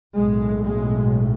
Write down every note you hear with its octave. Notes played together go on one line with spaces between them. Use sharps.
B1 A2 G#3
G#3